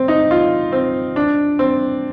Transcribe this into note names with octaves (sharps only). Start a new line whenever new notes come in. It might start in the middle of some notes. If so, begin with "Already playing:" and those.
Already playing: C4
D#4
F4
C4
D4
C4